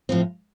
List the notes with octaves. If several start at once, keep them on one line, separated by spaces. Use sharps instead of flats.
A2 F3 C4